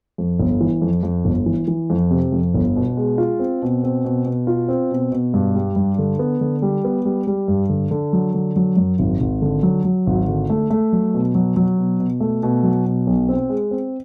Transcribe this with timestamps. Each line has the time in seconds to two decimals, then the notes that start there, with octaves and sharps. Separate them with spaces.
0.18 F2
0.40 G1
0.61 E3
0.82 F2
1.03 F2
1.25 G1
1.46 E3
1.68 E3
1.90 F2
2.11 C3
2.32 F2
2.54 G1
2.76 B2
2.97 G#3
3.18 F4
3.39 C4
3.62 B2
3.84 C4
4.05 B2
4.25 B2
4.47 F4
4.68 C4
4.91 B2
5.12 B2
5.34 G2
5.55 G3
5.76 G2
5.98 D3
6.19 B3
6.41 D3
6.62 G3
6.84 B3
7.05 G3
7.27 G3
7.48 G2
7.69 D3
7.91 D3
8.13 F#3
8.34 D3
8.56 F#3
8.77 F#2
8.99 G#1
9.21 G#1
9.42 D3
9.63 F#3
9.84 F#3
10.07 G#1
10.28 D3
10.50 A3
10.70 A3
10.93 F#3
11.14 B2
11.35 F#3
11.56 F#3
11.78 B2
11.99 B2
12.20 A3
12.43 B2
12.63 F#3
12.86 B2
13.07 B1
13.29 C4
13.49 G#3
13.71 C4